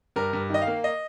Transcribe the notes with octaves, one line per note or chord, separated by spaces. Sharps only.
G2 A#4
G2
D#3 D#5
F5
A#3
D#5